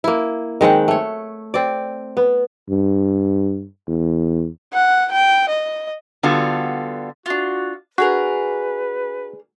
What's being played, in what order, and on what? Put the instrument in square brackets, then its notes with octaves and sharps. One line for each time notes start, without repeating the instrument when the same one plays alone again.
[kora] A#3 E4
D#3 G#3 C4 F#5
A3 C#5
C4 D5
B3
[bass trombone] G2
E2
[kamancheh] F#5
G5
D#5
[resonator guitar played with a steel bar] D3 G3 B3 F4 F#4 A4
[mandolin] D4 F4 [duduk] F#4
[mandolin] D4 G#4 A#4 [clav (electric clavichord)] F#4 [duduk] B4